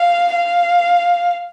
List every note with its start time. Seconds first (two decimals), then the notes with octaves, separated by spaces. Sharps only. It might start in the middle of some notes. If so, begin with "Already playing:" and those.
Already playing: F5
0.34 F5